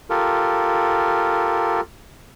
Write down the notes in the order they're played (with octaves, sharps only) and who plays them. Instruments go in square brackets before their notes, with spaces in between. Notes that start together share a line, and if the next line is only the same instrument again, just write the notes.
[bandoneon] F4 G4 A4 A#4